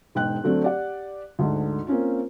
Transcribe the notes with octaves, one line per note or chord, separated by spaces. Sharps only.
E1 G#2 G5 F#6
D3 F#3 A3 C4 D4
G4 D5 F#5
D2 G#2 D3
A#3 C4 C#4 F4